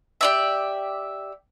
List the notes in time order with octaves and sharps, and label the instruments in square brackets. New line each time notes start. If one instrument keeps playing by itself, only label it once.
[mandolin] G4 D5 E5